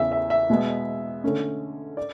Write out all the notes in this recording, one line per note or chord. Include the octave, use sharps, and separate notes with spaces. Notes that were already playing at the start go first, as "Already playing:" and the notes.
Already playing: E2 C#3 E3 E5
E5
E5
B2 G#3 B3
D3 A3 C#4
D5